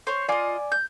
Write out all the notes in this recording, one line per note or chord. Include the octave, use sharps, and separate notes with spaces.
C5 C#5
F4 D5 D#5 G#5 D6
G6